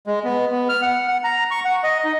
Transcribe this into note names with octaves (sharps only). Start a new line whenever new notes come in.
G#3
B3
B3
F6
F#5
F#5
A#5
C#6
F#5
D#5
D#4